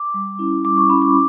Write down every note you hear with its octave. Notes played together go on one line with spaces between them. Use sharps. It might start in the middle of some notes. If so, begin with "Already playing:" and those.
Already playing: D6
G3
C#4 E4
G3 D6
C#6
C#4 E4 B5
D6